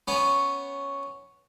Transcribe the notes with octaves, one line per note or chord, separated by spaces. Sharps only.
B3 C#4